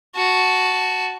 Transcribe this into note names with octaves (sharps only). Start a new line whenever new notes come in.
F#4 A5